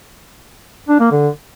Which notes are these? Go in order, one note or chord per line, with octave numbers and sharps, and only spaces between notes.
D4
A#3
D3